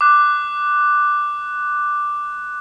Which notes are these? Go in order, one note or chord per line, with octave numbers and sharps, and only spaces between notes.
D6 F#6